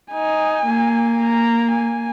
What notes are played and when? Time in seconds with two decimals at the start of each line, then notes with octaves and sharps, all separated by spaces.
0.13 D#4 G#5
0.68 A#3
1.22 A#5
1.76 G#5